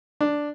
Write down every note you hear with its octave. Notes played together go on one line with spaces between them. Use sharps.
D4